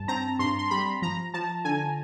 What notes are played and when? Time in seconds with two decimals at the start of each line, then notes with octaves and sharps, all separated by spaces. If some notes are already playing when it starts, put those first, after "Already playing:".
Already playing: G2 A5
0.08 C4 A#5
0.39 G2 C6
0.59 C6
0.70 G3 B5
1.02 F3 A#5
1.34 F3 A5
1.65 D3 G#5